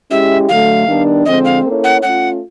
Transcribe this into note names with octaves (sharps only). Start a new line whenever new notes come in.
G#3 C#4 E4 G4 E5
D3 F#3 A3 F5
D#3 G3 B3 D4
D3 F3 G#3 C4 D#5
F5
A#3 C#4 E4 A4 C#5
F#5
A3 C#4 F4 F#5